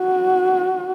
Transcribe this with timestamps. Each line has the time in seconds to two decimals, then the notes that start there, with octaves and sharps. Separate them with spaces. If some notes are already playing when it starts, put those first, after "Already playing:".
Already playing: F#4